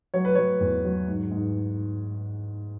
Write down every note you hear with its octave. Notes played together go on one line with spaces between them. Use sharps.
F#3 C#5
B4
F#3 C#5
E2
F#3
G#2
G#2